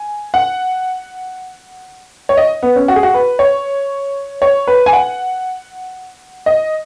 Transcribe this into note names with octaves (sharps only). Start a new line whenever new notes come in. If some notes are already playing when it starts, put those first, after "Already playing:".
Already playing: G#5
F#5
C#5
D#5
B3
C#4
F#4
G#4
F#4
B4
C#5
C#5
B4
G#5
F#5
D#5